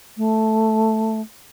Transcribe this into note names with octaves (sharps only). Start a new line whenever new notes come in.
A3